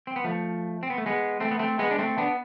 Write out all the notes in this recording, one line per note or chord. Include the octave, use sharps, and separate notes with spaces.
C4
B3
F3 A3
C4
B3
A3
G#3 B3
A3 C4
B3
A3 C4
G#3 B3
D4
A3 C4
B3 D4